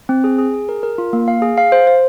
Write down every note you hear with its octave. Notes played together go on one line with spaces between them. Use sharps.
C4
G#4
G#4
G#4
A#4
A#4
F4
A#3
F5
G#4
F5
C5
C5